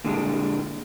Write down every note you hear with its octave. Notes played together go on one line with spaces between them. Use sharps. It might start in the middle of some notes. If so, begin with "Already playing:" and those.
A#2 D3 G3 G#3 C#4 D4